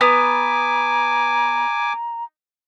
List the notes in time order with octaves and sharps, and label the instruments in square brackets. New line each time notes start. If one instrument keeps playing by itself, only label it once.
[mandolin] B3 [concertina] G#5 D6 [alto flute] A#5